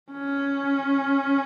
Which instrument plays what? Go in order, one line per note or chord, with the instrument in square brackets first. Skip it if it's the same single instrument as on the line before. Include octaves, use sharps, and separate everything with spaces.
[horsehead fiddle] C#4